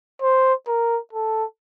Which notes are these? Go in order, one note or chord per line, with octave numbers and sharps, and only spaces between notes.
C5
A#4
A4